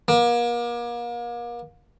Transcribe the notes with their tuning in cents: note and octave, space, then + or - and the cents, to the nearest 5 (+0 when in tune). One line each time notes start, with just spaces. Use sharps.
A#3 +35